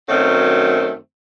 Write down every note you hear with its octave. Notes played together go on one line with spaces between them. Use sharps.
F#2 D#3 F#3 A3 C4